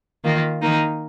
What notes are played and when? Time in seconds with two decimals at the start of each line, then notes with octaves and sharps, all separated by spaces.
0.24 D#3 A#3 F4
0.61 D#3 A#3 D#4